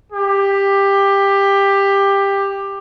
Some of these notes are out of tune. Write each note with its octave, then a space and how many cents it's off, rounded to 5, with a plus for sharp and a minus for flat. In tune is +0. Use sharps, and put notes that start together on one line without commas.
G4 +15